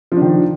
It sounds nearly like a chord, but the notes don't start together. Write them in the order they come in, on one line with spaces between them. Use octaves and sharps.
F3 D4 D#3